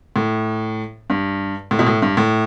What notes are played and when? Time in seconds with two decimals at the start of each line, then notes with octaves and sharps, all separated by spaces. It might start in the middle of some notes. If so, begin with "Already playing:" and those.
0.16 A2
1.10 G2
1.71 A2
1.79 B2
1.86 A2
2.02 G2
2.17 A2